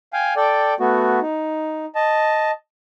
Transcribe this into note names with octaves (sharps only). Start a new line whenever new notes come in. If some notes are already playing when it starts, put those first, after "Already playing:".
F5 G5 G#5
A4 D5 G5
A3 B3 F#4
D#4
D#5 A5